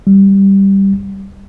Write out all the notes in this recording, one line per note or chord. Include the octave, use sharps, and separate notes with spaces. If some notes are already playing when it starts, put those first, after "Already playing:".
G3